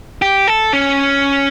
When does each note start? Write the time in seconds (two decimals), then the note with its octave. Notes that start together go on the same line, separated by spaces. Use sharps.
0.22 G4
0.48 A4
0.73 C#4